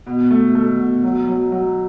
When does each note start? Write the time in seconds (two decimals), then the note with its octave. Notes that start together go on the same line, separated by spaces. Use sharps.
0.06 B2
0.31 A3
0.55 A3
0.79 B2
1.03 F#3
1.27 F#3
1.52 F#3